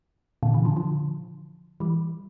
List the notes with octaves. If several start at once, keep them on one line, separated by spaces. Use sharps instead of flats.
A#2 D3
C#3 E3
D3 F3
D3 F3
E3 G3